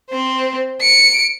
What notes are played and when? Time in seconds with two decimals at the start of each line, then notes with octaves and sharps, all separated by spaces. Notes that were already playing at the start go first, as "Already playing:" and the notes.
0.10 C4 C5
0.82 C#7 D7